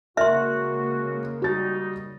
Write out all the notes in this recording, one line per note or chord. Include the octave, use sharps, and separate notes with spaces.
C#3 G#3 A#3 F#4 A#4 E5 C6 F6
G3 D#4 F#4 A6